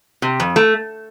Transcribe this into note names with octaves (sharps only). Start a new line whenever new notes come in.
C3
F2
A3